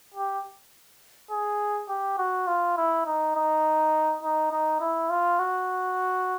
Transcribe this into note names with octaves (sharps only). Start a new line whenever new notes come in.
G4
G#4
G4
F#4
F4
E4
D#4
D#4
D#4
D#4
E4
F4
F#4